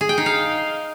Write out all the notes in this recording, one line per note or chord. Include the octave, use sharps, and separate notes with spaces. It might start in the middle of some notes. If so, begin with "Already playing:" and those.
G#4
G5
D#4
F5